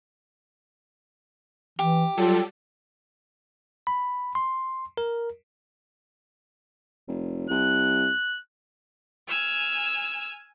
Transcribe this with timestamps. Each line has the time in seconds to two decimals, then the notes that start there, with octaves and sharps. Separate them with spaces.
1.79 E3 G4
2.18 F#3 G3 F4 A4
3.87 B5
4.35 C6
4.97 A#4
7.08 F1
7.50 C2 F#6
9.28 G#5 E6 F6